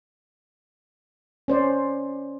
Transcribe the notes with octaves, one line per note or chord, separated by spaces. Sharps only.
C#4 C5 D5